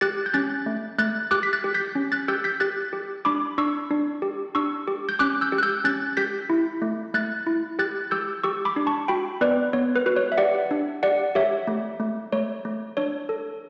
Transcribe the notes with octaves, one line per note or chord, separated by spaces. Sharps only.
G4 F#6 A6
G6
C#4 F#6 A6
A3
A3 F#6 A6
G4 D6 F#6
B6
F#6 A6
G4
G6 B6
C#4
F#6 A6
G4 E6 G6
G6 B6
G4 F#6 A6
G4
D4 B5 D6
D4 C#6 E6
D4
G4
D4 C#6 E6
G4
G6
C#4 D6 F#6
E6 G6
G4
F#6
E6 G6
C#4 F#6 A6
G4 G6 B6
E4
A3
A3 F#6 A6
E4
G4 F#6 A6
G4 E6 G6
G4 C#6 E6
B5 D6
D4
A5 C#6
F#4 G5 B5
B3 B4 D5
B3 C#5
B4
F#4 B4
C#5
E5
G4 D5 F#5
D4
G4 D5 F#5
G4 C#5 E5
A3
A3
A3 C#5
A3
D4 C#5
A4